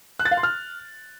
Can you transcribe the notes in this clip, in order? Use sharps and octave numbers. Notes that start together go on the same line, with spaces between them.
F#6
A6
F5
C6
F6